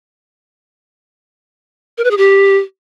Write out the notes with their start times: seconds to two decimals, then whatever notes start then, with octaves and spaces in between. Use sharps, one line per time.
1.98 A#4
2.04 B4
2.11 G#4
2.17 G4